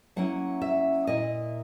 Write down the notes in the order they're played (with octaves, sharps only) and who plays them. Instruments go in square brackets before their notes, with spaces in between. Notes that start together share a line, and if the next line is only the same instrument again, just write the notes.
[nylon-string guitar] F#3 A#3 C#4 E4 F#5
E5
A#2 A#3 E4 D#5